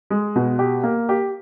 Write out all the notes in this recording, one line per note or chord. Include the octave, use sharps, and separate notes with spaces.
G#3
B2
G4
A#3
G4